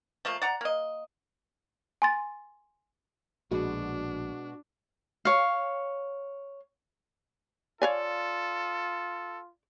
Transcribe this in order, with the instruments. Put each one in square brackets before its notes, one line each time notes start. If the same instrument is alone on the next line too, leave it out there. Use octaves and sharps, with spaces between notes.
[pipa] F3 A3 A#3
D5 F#5 A#5
A#3 D#5
[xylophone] G#5 C6 A6
[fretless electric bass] A#1 [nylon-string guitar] B2 G#3 [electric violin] D4 [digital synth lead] F#4
[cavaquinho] C#5 F5
[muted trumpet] F4 [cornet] A4 [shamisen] C#5 F5 G#5 [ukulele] D5